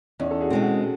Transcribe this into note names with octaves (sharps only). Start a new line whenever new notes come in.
E2 C#4 D#4
A4
F#4 G#4
B2 G#3 C4
F#4 G#4